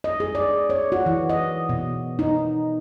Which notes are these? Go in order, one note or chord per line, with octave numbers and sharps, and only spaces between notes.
D#5
G#4
D5
C#5
F#4
E3
D#5
B2
D#4